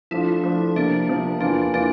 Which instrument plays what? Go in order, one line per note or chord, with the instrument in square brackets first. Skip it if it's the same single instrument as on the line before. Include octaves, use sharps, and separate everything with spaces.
[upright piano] F3 A3 D4 F4 [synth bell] E4
[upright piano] F3 A3 D4 F4
[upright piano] C3 F3 A#3 [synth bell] D4
[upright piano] C3 F3 A#3
[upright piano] E2 E3 A#3 F4 [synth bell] D4
[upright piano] E3 A#3 F4 [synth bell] D4